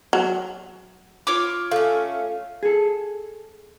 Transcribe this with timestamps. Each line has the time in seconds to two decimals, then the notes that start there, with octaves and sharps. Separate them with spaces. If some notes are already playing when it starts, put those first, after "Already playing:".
0.13 F#3
1.27 F4 C#5 D6
1.71 A3 C#4 F5
2.63 G#4 A4